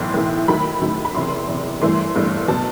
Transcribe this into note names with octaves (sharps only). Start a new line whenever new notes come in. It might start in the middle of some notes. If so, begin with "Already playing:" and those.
Already playing: B1 A2 E3 C6
B1 A2 E3
D#2 D#3 F#3 A3 B5
D#2 D#3 F#3 A3
B5
F#1 E2 C3 C6
F#1 E2 C3
G1 G2 E3 A3 C6
G1 G2 E3 A3
B2 F#3 A5